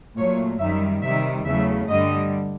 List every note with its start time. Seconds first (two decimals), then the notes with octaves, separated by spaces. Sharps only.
0.17 A#2 F#3 A3 C#5
0.59 F#2 D#3 G3 E5
1.02 C3 D#3 G3 E5
1.45 E2 C#3 F#3 A3 E5
1.88 G2 D3 G3 D#5